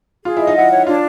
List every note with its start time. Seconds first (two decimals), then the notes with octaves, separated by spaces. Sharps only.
0.25 F4 G#4
0.37 E4 D#5
0.47 D#4
0.56 E4 F#5
0.72 C#5
0.87 D4 F4